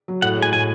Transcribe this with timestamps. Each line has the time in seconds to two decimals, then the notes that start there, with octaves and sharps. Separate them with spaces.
0.08 F#3
0.22 A2 F#5
0.38 G#3 G#5
0.53 A2 G#5